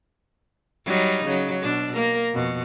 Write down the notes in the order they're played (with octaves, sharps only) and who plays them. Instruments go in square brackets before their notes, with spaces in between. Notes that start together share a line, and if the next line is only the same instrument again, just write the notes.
[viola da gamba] F#3 G3 D#4
C#3 F#3
B2 D4
A#3 A#4
F2 B2